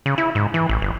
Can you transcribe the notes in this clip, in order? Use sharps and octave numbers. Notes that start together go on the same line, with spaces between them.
C#3
E4
G#2
E3
A1
G1